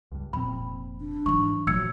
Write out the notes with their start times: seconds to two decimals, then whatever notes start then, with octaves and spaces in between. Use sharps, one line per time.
0.12 C#2 G2
0.33 F1 A#2 F3 C4 B5
1.00 D4
1.26 G#2 E3 F#3 G#3 C#6
1.67 F#1 A#2 F3 F#3 A3 E6 G#6 C#7